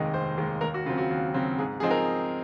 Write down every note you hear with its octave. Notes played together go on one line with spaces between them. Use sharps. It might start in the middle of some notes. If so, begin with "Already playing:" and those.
Already playing: F1 D#2 D#3 G#3 D#5
F1 C5
D#2 D#3 G#3
D#2 A#4
F#4
C#3 F#3 C4 F4
F#4
D#2
C#3 F#3 C4
G#2 G#4
F3 C4 D#4 G#4
A#4